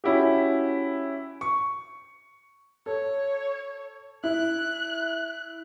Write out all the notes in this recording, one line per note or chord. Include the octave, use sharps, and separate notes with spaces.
C#4 E4 F#4 G4
C#6
A4 C#5
E4 F#6